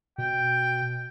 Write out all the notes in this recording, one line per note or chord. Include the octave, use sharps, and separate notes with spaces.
B2 G5